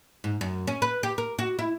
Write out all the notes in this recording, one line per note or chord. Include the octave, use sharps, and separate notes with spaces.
G#2
F#2
C#4
B4
G4
A#4
F#4
E4